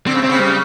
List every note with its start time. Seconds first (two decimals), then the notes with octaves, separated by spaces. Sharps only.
0.06 D3 C4
0.14 C#3
0.22 C3 C4
0.29 C#3
0.40 G3